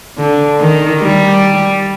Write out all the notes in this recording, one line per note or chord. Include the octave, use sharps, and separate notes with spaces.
D3
D#3
G3